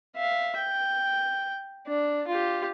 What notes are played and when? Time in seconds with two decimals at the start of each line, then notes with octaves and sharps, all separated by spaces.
0.16 E5 F5
0.57 G5
1.87 D4
2.27 F4 G4